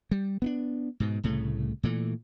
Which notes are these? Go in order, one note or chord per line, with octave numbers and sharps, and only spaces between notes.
G3
B3 C#4 D4
G#2 B2
C2 A2 C#3 A3
A#2 E3 A3